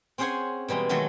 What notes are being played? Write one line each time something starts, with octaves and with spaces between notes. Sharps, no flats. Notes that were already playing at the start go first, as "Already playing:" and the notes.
C4 C#4 G#4 C5 F#5 G#5
B2 E3 G3 G#3
D#3 F#3 G#3 A3 A4 D#5